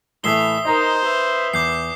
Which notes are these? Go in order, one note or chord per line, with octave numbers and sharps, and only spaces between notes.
A2 E3 A3 E5 D#6 C7 G7
D#4 A#4 C5 D#5 A#5
B4 E5
E2 D6 G6 C7